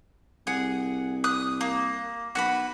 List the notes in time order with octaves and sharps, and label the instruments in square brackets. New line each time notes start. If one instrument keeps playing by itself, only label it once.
[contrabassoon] C2 [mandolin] G#4 F#5
[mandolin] D#6 F#6
A#3
[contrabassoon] B1 [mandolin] F#4 A#4 B4